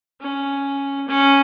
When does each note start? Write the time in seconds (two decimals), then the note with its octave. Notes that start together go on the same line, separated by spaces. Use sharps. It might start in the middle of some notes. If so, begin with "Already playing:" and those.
0.21 C#4
1.08 C#4